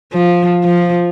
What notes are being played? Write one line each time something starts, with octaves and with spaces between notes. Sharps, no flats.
F3
F3